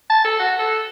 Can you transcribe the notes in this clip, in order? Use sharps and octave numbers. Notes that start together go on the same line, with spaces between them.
A5
A4
F#4
A4